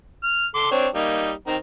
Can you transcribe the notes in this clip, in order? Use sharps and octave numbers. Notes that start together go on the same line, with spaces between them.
F6
A4 C6 D6
C4 D4 C#5
G3 A#3 D#4
D#3 C4 A#5